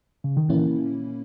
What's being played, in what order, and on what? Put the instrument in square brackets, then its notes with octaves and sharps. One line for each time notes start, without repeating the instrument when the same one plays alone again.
[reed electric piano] C#3
D#3
[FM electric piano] A#2 A#3 C#4 E4 [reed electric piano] E3